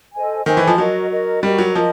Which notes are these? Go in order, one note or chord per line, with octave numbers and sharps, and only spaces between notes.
A4 C5 D#5 G#5
D#3 A4 C5 D#5 G#5
E3
F3
F#3 F#4 A#4 D#5
F#4 A#4 D#5
G3 F#4 A#4 D#5
F#3
F3 A#4 D#5